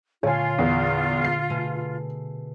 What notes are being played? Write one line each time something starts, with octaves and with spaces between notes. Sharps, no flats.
A#2 D3 A3 F4 C#5 G#5
E2
C7
B2 A3 G#4